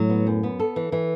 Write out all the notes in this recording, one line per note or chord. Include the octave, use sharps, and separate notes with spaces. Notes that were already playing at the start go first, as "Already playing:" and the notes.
Already playing: A2 F#3
B3
F#2
B3
A4
E3
E3